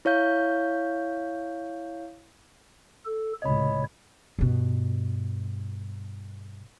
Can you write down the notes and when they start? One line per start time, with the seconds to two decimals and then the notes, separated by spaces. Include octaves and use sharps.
0.05 E4 C#5 F5 G6
3.05 A4
3.42 C#2 A2 C3 C#5 D#5 B5
4.39 G2 B2